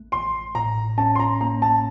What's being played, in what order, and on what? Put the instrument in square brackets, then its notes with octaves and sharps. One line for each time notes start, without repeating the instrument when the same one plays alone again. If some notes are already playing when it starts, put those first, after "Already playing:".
Already playing: [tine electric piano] A1 A3
[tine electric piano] A1 [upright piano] C6
[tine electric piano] A2 [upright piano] A#5
[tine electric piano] C#4 [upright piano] A5
[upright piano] C6
A#5
[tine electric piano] A#3 [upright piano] A#5
[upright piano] A5